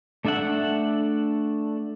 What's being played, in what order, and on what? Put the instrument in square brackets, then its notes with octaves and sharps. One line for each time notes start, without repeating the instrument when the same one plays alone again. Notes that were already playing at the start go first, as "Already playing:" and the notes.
[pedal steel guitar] A3 D4 A4 E5 F#5